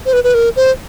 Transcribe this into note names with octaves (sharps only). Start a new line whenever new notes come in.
C5
B4
B4
A#4
C5